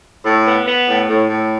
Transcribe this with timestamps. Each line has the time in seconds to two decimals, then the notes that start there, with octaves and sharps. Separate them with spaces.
0.24 A2
0.46 B3
0.66 B3
0.87 A2
1.08 A2
1.29 A2